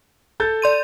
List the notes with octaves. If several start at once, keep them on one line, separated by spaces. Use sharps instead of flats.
A4 G6 A6
D5 C6 D#7